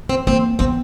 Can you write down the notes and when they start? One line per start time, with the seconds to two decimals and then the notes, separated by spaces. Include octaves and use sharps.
0.09 C4
0.27 A#3 C4
0.59 B3 C4